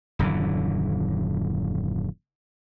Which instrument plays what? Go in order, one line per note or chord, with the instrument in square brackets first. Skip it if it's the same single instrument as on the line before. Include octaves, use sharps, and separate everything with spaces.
[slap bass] D#1 F#2 D3 E3